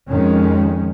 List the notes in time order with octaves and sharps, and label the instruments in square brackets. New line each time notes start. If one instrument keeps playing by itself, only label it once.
[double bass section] F2 D#3 G#3 C#4